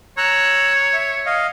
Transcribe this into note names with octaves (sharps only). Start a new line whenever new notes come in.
C#5 A#5 E6 F#6
E5
D#5 F5